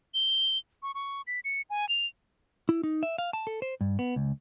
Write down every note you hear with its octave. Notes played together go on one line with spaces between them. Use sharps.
G7
C#6
C#6
B6
C#7
G#5
F7
E4
D#4
E5
F5
A5
A4
C5
G2
B3
C#2